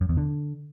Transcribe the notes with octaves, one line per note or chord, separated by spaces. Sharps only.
F#2
E2
D3